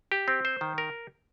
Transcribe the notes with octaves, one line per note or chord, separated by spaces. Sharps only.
G4
C4
C5
D#3
A#4